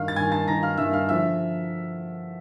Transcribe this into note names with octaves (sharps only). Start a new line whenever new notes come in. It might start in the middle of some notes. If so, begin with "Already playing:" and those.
Already playing: G2 D#3 F5 F6
A6
G2 D#3 G#5 G#6
A5 A6
G2 D#3 A#5 A#6
F5 F6
G2 D#3 E5 E6
F5 F6
D3 F3 E5 E6